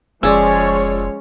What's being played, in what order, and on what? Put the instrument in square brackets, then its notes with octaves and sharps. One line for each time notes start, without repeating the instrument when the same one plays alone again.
[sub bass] F1 [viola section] F3 G#3 C#5 [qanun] C#4 G#4 [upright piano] D5 E6